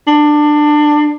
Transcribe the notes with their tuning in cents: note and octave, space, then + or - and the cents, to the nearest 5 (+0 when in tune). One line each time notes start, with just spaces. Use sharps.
D4 +20